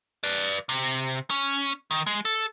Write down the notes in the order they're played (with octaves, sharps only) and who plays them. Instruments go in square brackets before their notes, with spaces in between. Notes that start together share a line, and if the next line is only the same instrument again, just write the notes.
[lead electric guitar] B4 D5
C3
C#4
D#3
G#3
A4